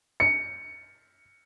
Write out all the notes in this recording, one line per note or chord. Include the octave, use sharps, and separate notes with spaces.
C#7